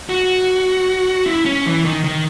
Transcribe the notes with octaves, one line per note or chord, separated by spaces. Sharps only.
F#4
E4
C#4
E3
D#3
D#3